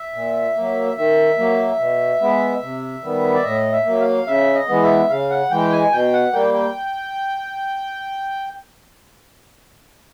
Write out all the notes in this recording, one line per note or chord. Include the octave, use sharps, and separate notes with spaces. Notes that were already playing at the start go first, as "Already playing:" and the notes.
Already playing: E5
A#2
F#3 A#3
D#3 E5
F#3 A#3
B2
G#3 B3
C3
D#3 G3 B3
D5
A2 D#5
E5
F#3 A#3
F5
C#3 E5
D#5
E3 G#3 B3
E5
C#3 F5
F#5
E3 G#3 G5
G#5
B2 G5
F#5
G3 A#3 G5
G5